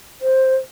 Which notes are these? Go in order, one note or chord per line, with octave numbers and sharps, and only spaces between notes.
C5